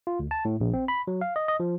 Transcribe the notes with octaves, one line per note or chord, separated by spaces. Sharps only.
F4
D2
A5
A2
A#1
C4
B5
F#3
F5
D#5
D#5
F3